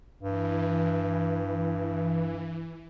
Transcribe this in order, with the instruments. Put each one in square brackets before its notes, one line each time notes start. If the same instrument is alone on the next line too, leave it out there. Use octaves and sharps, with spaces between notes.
[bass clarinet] G2 [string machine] E3